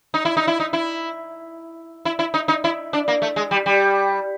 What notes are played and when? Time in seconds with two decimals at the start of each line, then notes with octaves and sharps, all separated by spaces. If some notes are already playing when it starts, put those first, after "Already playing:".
0.14 D#4
0.25 E4
0.37 D#4
0.47 E4
0.60 D#4
0.73 E4
2.05 E4
2.19 E4
2.34 D#4
2.48 D#4
2.64 E4
2.93 D4
3.08 A#3
3.22 A3
3.36 G#3
3.51 G3
3.66 G3